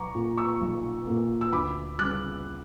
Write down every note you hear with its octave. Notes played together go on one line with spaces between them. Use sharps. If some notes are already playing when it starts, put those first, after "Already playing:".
Already playing: B1 A#5 C#6 D6
A#2 A#3
C#6 E6
B1
A#2 A#3
E6
D2 B5 D6
C#3 G3 D6 F#6